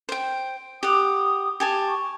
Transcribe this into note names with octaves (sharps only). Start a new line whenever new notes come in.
C5 G5
G4 F#5 D#6
G4 G#5 A5
C#6